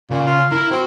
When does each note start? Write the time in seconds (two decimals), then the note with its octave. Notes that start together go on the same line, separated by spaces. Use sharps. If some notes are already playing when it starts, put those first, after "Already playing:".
0.11 A#2 C#3
0.27 F4
0.52 E4 A#4 B5
0.71 C4 F#4